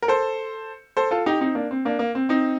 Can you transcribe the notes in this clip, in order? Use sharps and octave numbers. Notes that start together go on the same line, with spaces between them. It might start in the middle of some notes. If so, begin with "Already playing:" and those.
A#4
A4 C5
A4 C5
F4 A4
D#4 G4
C4 D#4
A#3 D4
C4
A#3 D4
A#3
C4
C4 D#4